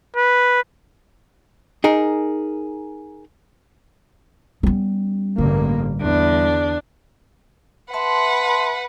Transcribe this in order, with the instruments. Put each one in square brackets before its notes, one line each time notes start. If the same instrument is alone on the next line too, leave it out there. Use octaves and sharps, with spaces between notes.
[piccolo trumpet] B4
[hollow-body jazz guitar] D#4 G#4 A#4
[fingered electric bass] G3 [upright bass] B3 C#4
[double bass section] A1 G2 A#3 [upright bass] D3
[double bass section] E2 [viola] D4
[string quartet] B4 F#5 [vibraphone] E5 A5 C6